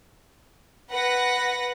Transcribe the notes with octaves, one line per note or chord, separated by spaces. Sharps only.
B4 F#5 A#6